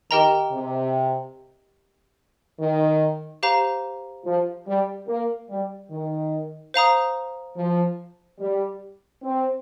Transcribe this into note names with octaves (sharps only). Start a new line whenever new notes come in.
D#3 G4 A#4 D#5 G5 A#5
C3
D#3
G4 C5 F5 A#5
F3
G3
A#3
G3
D#3
C5 F5 A#5 D#6
F3
G3
C4